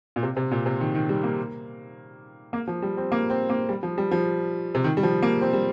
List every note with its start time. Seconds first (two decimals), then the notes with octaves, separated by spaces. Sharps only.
0.16 A#2
0.23 C3
0.37 C3
0.51 A#2
0.66 C3
0.81 D#3
0.95 D#3
1.09 G3
1.24 A#3
2.53 A#3
2.68 F3
2.82 G3
2.97 C4
3.12 A#3
3.30 C4
3.50 A#3
3.69 G3
3.83 F3
3.98 G3
4.11 F3
4.75 C3
4.84 D#3
4.97 G3
5.03 F3
5.23 A#3
5.41 C4
5.53 G3